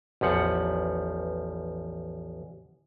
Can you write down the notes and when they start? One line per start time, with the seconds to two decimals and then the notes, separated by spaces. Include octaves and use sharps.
0.21 A1 E2 F3 F#5